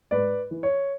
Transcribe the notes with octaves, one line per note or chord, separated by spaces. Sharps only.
G#2 B4 D5
E3
C#5